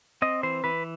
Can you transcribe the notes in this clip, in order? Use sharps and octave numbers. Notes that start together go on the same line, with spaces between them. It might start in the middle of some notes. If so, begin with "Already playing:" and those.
C4 D#5
E3 C5
E3 B4